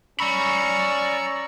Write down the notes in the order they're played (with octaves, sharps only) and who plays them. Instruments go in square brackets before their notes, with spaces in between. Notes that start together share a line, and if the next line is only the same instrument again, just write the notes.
[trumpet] C#4 [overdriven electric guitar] D5 B5 [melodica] A#5 C#6 E6